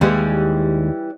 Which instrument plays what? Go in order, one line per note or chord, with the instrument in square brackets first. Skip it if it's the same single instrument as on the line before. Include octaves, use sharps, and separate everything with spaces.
[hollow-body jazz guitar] D#2 G#3 [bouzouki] E3 G3 C#4